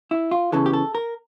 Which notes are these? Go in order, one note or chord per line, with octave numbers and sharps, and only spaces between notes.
E4
F4
E2 C#3 E3 A4
G4
A4
A#4